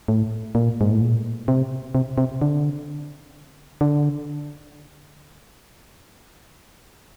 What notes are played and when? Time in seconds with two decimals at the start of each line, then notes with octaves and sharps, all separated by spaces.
0.08 A2
0.55 A#2
0.81 G#2
0.91 A2
1.01 A#2
1.48 C3
1.95 C3
2.18 C3
2.41 D3
3.81 D3